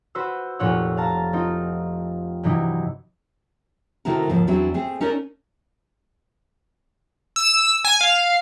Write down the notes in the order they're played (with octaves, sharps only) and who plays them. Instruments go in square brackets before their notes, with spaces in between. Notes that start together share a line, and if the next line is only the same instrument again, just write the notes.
[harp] F#4 B4 C5 E6
F1 A#2 F4 C#5 F#5 E6
F5 A5 A#5
C4 D#4 F4
G2 C3 E3 F#3 D#4 E4
[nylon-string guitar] C3 D#3 A3 E4 F#4 A#4
D#2 G#2 C#3 F3
E2 E3 F#3 C4 D4 E4
A3 C4 G#4
C#4 D#4 A4 A#4 C#5 D5
[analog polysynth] E6
G#5
F5